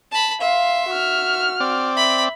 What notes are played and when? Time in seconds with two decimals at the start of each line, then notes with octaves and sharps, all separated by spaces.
0.12 A5 B5
0.41 E5 F5 C6
0.88 F#4 F6
1.60 C4 D5
1.97 E5 B5